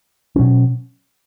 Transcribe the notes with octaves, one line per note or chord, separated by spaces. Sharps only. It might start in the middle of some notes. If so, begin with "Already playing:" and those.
B2 F#3 C#4